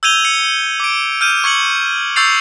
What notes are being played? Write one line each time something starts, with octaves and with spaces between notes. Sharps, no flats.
E6 G6 G#6 D#7 F7 G7
C#7
D6 D7
F6 G6 D#7
C#6 G#6 C#7 F#7
C#6 E6 G6 A6 C7 F7